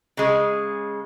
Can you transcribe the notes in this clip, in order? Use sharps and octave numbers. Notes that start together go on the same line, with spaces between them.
C#3 G#3